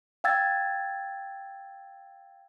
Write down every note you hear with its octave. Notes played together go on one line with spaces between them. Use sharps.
F5 G5 E6 G#6 A6